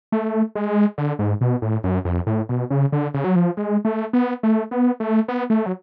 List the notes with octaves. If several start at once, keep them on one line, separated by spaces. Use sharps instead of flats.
A3
G#3
D3
G#2
B2
A2
F#2
F2
A2
B2
C#3
D3
C#3
F#3
F3
G#3
A3
B3
A3
B3
A3
B3
A3
F#3